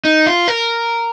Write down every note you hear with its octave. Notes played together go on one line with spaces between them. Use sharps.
D#4
F4
A#4